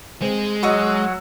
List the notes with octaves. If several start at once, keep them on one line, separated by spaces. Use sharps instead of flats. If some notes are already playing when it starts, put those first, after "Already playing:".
G#3 C4
F#3 F#4 D#5 F#5 C#6 D#6 E6